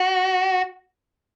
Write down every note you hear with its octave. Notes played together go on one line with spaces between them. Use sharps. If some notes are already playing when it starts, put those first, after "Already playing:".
Already playing: F#4